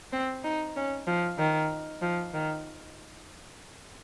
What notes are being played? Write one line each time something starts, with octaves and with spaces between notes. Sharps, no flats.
C4
D#4
C#4
F3
D#3
F3
D#3